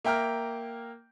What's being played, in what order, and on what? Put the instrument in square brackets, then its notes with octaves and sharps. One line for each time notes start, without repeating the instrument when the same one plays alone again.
[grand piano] A#3 E5 G5 A#5 F6